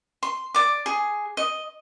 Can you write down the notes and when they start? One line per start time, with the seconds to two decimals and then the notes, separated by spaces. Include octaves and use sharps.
0.23 C6
0.54 D5 D6
0.86 G#4
1.37 D#5